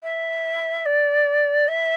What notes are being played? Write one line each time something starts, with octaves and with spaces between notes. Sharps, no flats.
E5
D5
E5